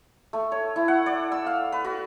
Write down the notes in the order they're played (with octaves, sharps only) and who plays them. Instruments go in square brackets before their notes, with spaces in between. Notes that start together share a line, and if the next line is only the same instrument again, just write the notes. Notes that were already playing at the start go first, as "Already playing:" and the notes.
[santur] A3
C#5
E4
F#5
D5
E6
F5
B4
F#4